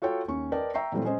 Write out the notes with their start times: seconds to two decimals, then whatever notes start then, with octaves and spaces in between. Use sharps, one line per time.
0.02 F4 F#4 A4 C#5 G5
0.28 D#2 C#4 C#6
0.52 A#4 B4 D5 D#5 G5 A5
0.74 E5 G5 A#5 C#6 C7
0.92 A#2 E3 F#3 G3 A3 C4
1.04 G#3 C#4 G#4 C5 D#5